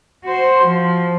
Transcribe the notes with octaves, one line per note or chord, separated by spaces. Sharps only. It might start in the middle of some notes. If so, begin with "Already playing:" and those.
F#4 C5
F3